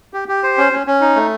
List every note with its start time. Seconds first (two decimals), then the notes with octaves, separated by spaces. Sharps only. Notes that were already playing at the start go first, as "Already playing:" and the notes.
0.13 G4
0.28 G4
0.43 C5
0.58 C#4
0.72 C#4
0.87 C#4
1.01 D#4
1.16 A3